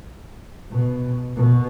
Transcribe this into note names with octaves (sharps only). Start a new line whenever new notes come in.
B2
B2